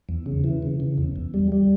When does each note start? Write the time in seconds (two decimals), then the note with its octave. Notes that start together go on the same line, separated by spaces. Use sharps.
0.09 E2
0.26 C#3
0.44 E3
0.63 C#3
0.80 C#3
0.98 E2
1.16 E2
1.34 G3
1.52 G3